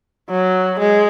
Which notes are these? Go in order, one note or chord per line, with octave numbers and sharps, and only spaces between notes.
F#3
G#3